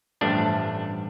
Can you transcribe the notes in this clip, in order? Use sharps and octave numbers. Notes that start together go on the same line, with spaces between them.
A1 G2 F3 A3 D4